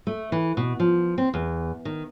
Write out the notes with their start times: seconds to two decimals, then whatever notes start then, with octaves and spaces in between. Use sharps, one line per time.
0.07 A3
0.32 E3
0.57 B2
0.80 F3
1.18 C4
1.34 E2
1.85 D#3